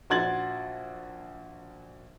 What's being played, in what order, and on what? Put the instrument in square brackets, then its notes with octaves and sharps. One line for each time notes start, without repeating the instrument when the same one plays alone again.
[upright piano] A#1 F#4 C6 G#6 A6 F#7